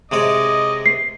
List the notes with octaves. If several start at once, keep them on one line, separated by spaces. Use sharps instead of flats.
C3 G#3 C#5 D#5 D6 D#6
C7